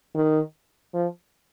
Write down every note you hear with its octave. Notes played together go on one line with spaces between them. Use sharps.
D#3
F3